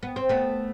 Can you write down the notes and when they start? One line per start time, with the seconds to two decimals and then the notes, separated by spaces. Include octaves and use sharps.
0.03 B3
0.16 C4
0.29 A3 B3